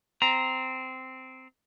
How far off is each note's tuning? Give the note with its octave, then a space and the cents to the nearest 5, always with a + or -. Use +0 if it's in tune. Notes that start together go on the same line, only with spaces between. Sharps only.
C4 -10 A#5 +10